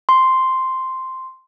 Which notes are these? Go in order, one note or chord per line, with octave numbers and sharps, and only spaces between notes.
C6